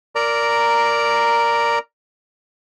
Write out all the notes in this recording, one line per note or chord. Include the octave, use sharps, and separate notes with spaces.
A#4 D5 A#5